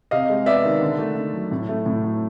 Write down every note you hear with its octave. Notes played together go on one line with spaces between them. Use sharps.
C3 D#5 F5
G#3
B3 D5 E5
D#3
D3
A3
D3
F#3
A2
A3
A2
F#3